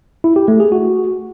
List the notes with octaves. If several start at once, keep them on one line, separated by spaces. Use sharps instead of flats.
E4
G4
A3
G#4
F#4